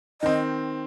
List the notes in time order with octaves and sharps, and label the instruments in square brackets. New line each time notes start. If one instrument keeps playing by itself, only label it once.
[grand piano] D#3 C4 [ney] D#5